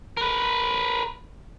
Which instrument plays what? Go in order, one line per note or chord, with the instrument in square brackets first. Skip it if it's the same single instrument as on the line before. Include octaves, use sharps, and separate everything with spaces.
[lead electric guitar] A#4 B4